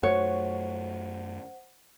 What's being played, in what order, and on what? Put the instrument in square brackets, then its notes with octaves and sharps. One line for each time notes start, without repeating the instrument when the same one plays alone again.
[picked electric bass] F#2 A3 [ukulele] F#4 C#5 [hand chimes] C5 F#5